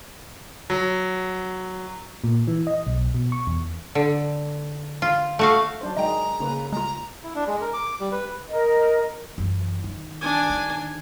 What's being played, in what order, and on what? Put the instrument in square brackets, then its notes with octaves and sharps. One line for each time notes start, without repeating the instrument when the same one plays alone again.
[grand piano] F#3
[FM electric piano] A#2
E3
D#5
B1
B2
C#6
E2
[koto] D3
F4
A3 F#4 F5
[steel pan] F#3 D4 C5
[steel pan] D#3 G#3 [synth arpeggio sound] D#5 G5 [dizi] A#5
[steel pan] C#3 A#3 B4
[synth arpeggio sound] G#3 F4 [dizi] A#5
[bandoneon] E4
D4
G#3
A#4
D6
G3
B4
[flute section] A#4 D#5
[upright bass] F#2 E3
D#3
[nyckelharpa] D4 G#5
[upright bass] D#3